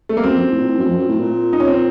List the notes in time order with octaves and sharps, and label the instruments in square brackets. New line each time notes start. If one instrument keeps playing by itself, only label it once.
[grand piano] A3
A#3
[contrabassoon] F#2 [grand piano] C4
[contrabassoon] F2
F#2
A2
A#2
A2
F#2
F2
F#2
A2
A#2
[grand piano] D#4
C#4
C4